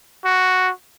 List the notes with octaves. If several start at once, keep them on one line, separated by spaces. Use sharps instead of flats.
F#4